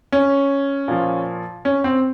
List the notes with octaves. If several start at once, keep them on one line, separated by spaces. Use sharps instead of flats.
C#4
A#2 F3
C#4
C4